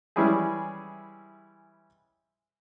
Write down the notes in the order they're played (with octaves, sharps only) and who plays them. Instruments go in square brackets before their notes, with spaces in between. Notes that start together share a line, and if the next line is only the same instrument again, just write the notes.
[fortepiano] E3 G3 G#3 C#4 E4 G#4